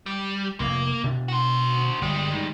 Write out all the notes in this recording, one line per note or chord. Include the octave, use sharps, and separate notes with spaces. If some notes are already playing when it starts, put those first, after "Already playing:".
G3
F1 F2 A#3
B2 D4
F#4 C5
G1 G3 G#3
D#3